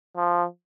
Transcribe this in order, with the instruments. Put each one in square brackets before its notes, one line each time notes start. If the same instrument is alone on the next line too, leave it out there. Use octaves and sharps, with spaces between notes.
[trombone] F3